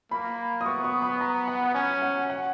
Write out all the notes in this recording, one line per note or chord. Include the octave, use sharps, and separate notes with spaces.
A#3 B5
D#6
B3 C#6
C#6
B5
A#5
F#5
C#4 G#5
F#5
F#5